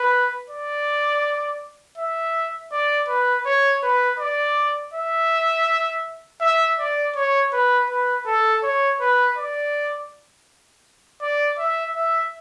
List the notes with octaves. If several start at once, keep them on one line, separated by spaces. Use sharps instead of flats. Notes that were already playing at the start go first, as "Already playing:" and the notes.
Already playing: B4
D5
E5
D5
B4
C#5
B4
D5
E5
E5
D5
C#5
B4
B4
A4
C#5
B4
D5
D5
E5
E5